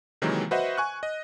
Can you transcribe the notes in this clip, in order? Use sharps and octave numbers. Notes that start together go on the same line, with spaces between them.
C3 D#3 E3 F#3 G#3 A#3
F#4 B4 C5 D#5 E5 F#5
G#5 C#6 F#6
D#5